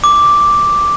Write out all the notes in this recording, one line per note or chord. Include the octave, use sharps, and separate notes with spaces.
D6